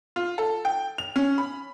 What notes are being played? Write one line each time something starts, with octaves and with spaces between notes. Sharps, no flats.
F4
A4
G5
F7
C#4
B5